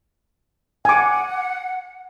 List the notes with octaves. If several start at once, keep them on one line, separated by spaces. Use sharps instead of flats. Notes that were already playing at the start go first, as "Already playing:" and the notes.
F#5 G#5 D6